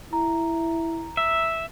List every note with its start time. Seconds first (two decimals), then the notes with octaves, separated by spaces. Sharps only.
0.13 E4 A#5
1.17 E5